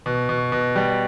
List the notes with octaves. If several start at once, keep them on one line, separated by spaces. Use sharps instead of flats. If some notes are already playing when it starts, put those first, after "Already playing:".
B2
B2
B2
G3